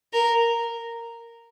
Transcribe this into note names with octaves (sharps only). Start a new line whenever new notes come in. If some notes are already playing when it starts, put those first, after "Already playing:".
A#4